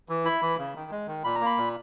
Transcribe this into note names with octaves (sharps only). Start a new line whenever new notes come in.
E3
E4 B5
E3
C#3
D#3
G#3
D#3
A#2 B5
A#5
A#3 B5
A#2